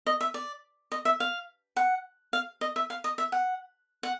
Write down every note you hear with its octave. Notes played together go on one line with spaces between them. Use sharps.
D#5
E5
D5
D#5
E5
F5
F#5
F5
D#5
E5
F5
D#5
E5
F#5
F#5